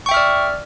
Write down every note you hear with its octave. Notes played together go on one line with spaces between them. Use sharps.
D5 E5 G5 C#6 F6